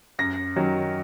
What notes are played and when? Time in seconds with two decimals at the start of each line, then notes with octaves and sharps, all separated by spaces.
0.19 F#2 A#6
0.56 D#3 F#3 C#4